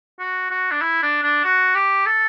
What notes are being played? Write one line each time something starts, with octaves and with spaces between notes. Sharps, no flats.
F#4
F#4
D4
E4
D4
D4
F#4
G4
A4